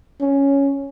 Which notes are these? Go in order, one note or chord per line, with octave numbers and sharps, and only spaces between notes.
C#4